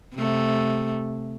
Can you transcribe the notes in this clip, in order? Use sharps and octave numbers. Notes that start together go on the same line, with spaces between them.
C3 A3